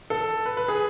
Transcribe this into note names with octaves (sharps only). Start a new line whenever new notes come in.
A4
B4
B4
G#4